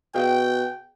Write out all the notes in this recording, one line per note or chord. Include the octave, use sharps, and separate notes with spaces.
B2 G#4 D5 F5 G5